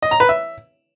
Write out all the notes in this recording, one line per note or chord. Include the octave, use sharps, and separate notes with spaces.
D#5
A#5
B4
E5